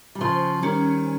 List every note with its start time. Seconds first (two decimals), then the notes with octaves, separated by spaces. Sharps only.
0.15 G3
0.21 C#3 F3 C5
0.62 D#3 G3 C#4